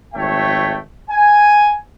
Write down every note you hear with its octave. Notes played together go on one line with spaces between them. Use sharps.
G#1 F2 A3 C#5 E5 G5
G#5